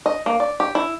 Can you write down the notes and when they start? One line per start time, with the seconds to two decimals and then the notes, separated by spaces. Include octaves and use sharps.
0.06 D#5
0.26 A#3
0.40 D5
0.60 G4
0.75 E4